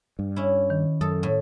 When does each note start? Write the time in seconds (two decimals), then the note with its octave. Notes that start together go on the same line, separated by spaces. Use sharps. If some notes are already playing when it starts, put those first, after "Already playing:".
0.19 G2
0.36 C#4 E4
0.70 D#3
1.01 F#2 A4 D#6
1.23 A2